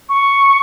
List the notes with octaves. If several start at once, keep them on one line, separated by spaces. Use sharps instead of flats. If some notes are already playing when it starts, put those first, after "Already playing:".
C#6